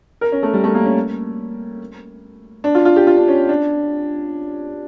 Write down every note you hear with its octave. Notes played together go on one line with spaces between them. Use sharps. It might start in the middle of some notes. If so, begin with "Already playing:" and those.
A#4
C#4
A3
G3
A3
A#3
C#4
D4
F4
F4
G4
F4
D4
C#4
D4